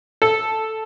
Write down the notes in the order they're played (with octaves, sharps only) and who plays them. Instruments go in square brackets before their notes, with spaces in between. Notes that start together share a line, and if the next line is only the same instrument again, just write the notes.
[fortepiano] A4